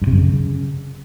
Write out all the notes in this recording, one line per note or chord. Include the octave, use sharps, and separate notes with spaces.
G2
C3
F#2
C#3